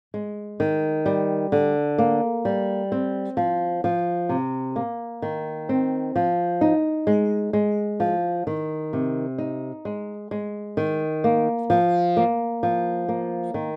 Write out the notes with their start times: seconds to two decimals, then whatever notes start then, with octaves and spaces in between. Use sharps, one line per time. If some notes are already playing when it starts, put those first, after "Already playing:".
0.14 G#3
0.60 D#3
1.06 G3
1.52 D3
1.98 A#3
2.45 G3
2.92 C4
3.37 F3
3.84 F3
4.29 C3
4.76 A#3
5.22 D#3
5.69 C4
6.16 F3
6.61 D#4
7.07 G#3
7.53 G#3
8.00 F3
8.47 D#3
8.93 C3
9.38 D#4
9.85 G#3
10.31 G#3
10.77 D#3
11.24 A#3
11.70 F3
12.17 A#3
12.63 F3
13.08 A#3
13.54 D#3